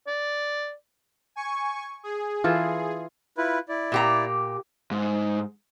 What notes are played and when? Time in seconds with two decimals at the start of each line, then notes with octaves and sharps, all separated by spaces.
0.07 D5
1.36 G#5 C#6
2.03 G#4
2.44 E3 F4 A4
3.38 E4 F4 B4
3.69 E4 D5
3.92 A#2 G4 A#5
4.91 G#2